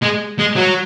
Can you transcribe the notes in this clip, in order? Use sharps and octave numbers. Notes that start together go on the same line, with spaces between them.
G#3
G#3
F#3